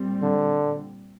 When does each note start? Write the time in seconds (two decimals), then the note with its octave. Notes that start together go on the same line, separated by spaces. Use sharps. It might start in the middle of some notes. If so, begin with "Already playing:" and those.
Already playing: A#2 G3 C4
0.22 D3